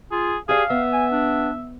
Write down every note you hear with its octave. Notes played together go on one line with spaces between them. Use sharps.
F4 G#4
G4 G#4 D5 F5
B3 E5
G#5
D4